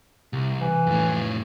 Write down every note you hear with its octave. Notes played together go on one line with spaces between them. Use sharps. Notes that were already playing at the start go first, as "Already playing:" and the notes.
C2
E3
F2 A2